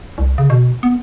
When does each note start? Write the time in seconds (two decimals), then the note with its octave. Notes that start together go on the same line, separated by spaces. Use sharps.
0.18 C2
0.38 C#3
0.50 B2
0.83 B3